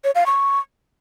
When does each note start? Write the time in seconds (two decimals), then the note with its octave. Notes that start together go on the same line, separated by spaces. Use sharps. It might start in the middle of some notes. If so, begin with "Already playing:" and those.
0.04 C#5
0.15 F5
0.26 C#6